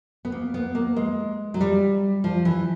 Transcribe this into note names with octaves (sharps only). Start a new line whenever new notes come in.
B3
A#3
B3
A#3
G#3
F#3
G3
F3
E3